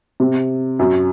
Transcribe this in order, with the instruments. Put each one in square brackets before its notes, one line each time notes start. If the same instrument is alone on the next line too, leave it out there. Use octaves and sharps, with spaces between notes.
[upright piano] C3
F#2